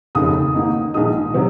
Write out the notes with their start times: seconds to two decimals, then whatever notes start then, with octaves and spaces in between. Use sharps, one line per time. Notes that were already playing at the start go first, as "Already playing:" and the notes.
0.15 F1 D#2 C#3 D#6
0.54 G#2 D#3 A#3 D#4
0.94 A#1 G#2 D#3 G#3 D#4 D#6
1.34 C3 F#3 C4 D#4